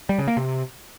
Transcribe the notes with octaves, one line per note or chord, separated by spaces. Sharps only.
G3
C#3
A#3
C3